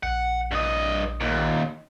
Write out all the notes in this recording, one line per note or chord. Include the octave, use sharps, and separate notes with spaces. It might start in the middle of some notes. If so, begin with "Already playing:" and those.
A#1 F#5
G2 D#5
D#2 A#2